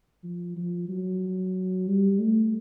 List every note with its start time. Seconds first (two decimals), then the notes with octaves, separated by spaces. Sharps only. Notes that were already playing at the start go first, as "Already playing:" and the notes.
0.23 F3
0.56 F3
0.89 F#3
1.88 G3
2.19 A3